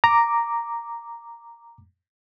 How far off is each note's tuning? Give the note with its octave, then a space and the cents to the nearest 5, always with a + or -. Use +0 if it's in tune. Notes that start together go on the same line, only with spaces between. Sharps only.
A#5 +0 D6 +0